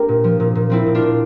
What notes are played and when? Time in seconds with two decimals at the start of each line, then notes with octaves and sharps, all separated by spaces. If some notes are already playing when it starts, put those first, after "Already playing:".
Already playing: A#3 C4 D4 G4 A#4
0.09 A#2
0.24 F3
0.40 A#2
0.55 A#2
0.70 F3 C4 E4
0.87 A#2
0.95 D4 F4
1.02 A#2